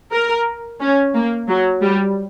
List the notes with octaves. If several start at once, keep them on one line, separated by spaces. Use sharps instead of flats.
A#4
C#4
A#3
F#3
G3